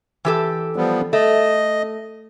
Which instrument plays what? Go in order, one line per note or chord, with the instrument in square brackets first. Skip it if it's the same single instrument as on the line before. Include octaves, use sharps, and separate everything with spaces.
[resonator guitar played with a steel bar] E3 G4 A4
[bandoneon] F3 G3 B3
[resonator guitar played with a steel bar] A3 [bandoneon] D#5